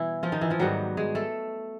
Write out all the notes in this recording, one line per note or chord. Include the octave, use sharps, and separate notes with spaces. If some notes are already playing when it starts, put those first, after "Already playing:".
Already playing: B2 E3 G3 B3 E4
F3 F4
D#3 D#4
E3 E4
F3 F4
G#2 D#3 F#3 G3 B3 F#4
G#3 G#4
A3 A4